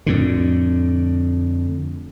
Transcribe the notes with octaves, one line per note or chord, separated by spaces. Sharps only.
F2 A2 D3